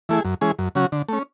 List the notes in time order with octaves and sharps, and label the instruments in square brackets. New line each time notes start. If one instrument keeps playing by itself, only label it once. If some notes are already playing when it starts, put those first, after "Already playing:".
[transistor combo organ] E3 A3 E4 G#4
F#2
E3 G#3 C#4 G#4
F#2
C#3 F#3 C#4 F#4
D3
A3 C#4